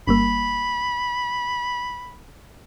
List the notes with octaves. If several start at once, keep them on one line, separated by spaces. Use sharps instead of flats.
G1 G3 A#3 B5